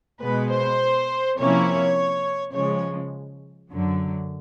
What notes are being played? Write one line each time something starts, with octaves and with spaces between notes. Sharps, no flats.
B2 G#3 B3 B4
C5
C3 F3 A#3 C#4 E4 C#5
C#3 F3 G#3 C#5
F#2 D3 F#3